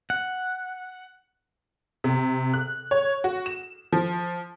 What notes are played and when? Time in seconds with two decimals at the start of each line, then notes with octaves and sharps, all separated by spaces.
0.10 F#5
2.04 C3
2.54 F#6
2.91 C#5
3.24 F#4
3.46 E7
3.93 F3